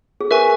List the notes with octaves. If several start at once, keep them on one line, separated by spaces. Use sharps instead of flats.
G#4
A#4 B4 E5 G#5 C#6